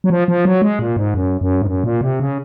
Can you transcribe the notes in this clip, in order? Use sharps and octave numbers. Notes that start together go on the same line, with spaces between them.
F#3
F3
F3
F#3
G#3
A#2
G#2
F#2
F#2
G#2
F#2
A#2
C3
C#3